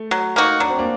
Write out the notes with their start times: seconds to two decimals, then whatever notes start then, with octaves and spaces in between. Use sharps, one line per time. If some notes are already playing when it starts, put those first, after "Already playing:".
Already playing: A3
0.11 F#3
0.36 A#3 D#4 F#4
0.60 F#3 D4
0.70 C4
0.78 A#3 D4